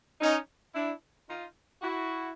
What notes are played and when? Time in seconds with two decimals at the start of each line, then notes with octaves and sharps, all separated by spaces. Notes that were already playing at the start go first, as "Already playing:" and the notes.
0.21 C#4 D#4
0.75 D4 E4
1.28 D#4 F4
1.82 E4 F#4